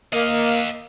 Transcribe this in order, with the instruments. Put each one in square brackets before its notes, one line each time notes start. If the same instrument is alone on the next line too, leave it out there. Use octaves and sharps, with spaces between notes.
[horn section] A#3 [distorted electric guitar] D#5 F5